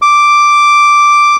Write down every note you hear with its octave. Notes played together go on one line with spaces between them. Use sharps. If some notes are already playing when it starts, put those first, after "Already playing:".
D6